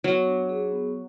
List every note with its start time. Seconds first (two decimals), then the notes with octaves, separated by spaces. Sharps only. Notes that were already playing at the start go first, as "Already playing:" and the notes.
0.04 F#3 B3
0.27 D4
0.49 G#4
0.72 B3